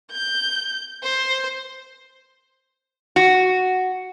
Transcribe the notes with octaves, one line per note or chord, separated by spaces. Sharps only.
G6
C5
F#4